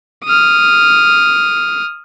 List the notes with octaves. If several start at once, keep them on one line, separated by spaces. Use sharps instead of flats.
D#6 F6